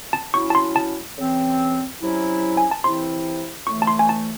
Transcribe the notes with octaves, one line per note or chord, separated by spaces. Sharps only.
A5
F#3 C#4 E4 C#6
A5
C6
A5
C#3 E3 C4
C3 F#3 C#4 E4
G#5
A5
C3 E3 C4 E4 C6
A2 E3 A3 C#6
A5
C6
G#5
A5